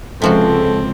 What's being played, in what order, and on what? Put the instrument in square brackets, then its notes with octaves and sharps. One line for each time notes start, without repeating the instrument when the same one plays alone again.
[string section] C#2 [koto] C3 F3 F#4 [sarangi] C4 [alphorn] A4